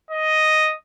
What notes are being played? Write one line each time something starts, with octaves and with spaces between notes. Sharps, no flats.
D#5